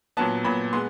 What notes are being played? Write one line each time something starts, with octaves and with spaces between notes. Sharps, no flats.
A#2 F#3 B3 A5
A#2 F#3 B3 B5
G#3 B3 C6